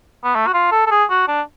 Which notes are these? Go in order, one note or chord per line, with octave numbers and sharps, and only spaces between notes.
B3
A3
F#4
F4
A4
A4
G#4
F#4
D4